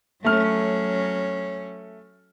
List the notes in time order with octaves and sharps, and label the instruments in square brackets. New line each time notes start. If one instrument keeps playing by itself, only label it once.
[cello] F#3 C#4 [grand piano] A3 F6